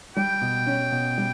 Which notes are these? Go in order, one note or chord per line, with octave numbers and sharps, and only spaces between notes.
G3 G5
B2
C#4
B2
G3